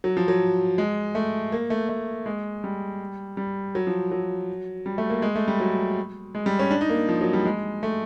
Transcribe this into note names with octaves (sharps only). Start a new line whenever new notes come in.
F#3
F3
F#3
G#3
A3
A#3
A3
A3
G#3
G3
G3
F#3
F3
F#3
G3
A3
A#3
G#3
A3
G3
F#3
G#3
G3
C#4
D4
D#4
A#3
F3
F#3
G3
G#3
A3